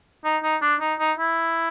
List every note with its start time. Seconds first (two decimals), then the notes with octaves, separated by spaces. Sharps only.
0.25 D#4
0.43 D#4
0.62 D4
0.81 D#4
0.99 D#4
1.18 E4